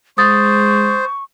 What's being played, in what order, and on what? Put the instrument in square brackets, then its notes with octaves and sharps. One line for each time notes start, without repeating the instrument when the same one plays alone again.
[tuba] G#3 [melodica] C5 [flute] C#6 [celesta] D#6 A6